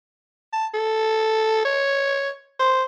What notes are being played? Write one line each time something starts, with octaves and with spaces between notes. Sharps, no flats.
A5
A4
C#5
C5